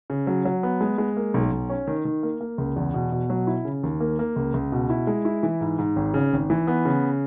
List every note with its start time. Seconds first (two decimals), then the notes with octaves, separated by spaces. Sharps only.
0.10 C#3
0.27 F#3
0.45 F#3
0.63 B3
0.81 G#3
0.98 G#3
1.17 A#3
1.34 B1
1.52 B1
1.70 C#4
1.87 D#3
2.05 D#3
2.23 A#3
2.41 A#3
2.58 C#2
2.76 E2
2.94 B2
3.12 B2
3.30 F#3
3.47 E4
3.65 C#3
3.83 D#2
4.01 A#3
4.19 A#3
4.36 C#2
4.54 C#2
4.72 B2
4.90 E4
5.07 G#3
5.25 E4
5.43 E3
5.61 G#2
5.78 G#2
5.96 G#1
6.14 C#3
6.32 G#1
6.50 E3
6.67 B3
6.85 C#3